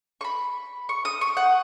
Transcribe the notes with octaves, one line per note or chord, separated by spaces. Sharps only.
C#6
B5
C#6
D#6
C#6
F#5